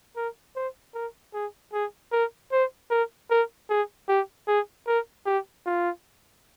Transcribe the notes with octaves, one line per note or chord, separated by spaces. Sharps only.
A#4
C5
A#4
G#4
G#4
A#4
C5
A#4
A#4
G#4
G4
G#4
A#4
G4
F4